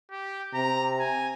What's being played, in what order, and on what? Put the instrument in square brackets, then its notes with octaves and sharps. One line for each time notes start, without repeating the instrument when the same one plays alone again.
[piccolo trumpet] G4
[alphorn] C3 [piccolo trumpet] A#5
[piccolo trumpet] G#5